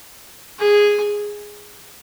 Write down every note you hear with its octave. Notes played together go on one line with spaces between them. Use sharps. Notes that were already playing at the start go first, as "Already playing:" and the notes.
G#4